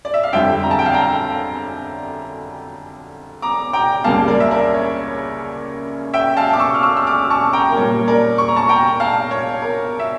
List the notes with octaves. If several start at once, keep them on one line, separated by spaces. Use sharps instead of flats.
D5
E5
F5
F2 D3 G3 E5 G5
A#5
A5
G5
F5 A5
G5 A#5
A#5 D6
G5 A#5
C#2 C#3 G3 A#3 F5 A5
A#4 D5
E5
A#4 D5
C#5
E5 G5
F5 A5
D6
C#6 E6
F6
C#6 E6
E6
D6 F6
A5 C#6
G5 A#5
A#4
A#2 G3 A#3 C#5
A#4 D5
C#6
A#5
A5 C#6
G5 A#5
F5 A5
C#5
A#4
E5